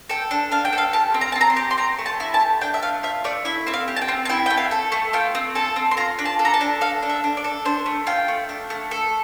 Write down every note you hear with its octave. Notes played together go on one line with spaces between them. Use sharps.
A4 G5
D4
D4 F5
G5
A4
F5
G4 A5
C4
A#5
A5
C4
A#5
C6
G4
C6
C4 A#5
A3
A5
E4
A5
G4
D4 G5
E5
A3 F5
F4 E5
A3 D5
E4 E5
C4 E5
F5
G4
A5
G5
C4
A5
E4 G5
A3 G5
F5
A4
A3
F4 G5
C4
A4 A5
C4
C6
F4 A#5
D4
A5
A4
A#5
A5
D4
A4 F5
D4
E5
D4
D5
A4
D4 C5
A3
F4 G5
A3
D4
A3
A4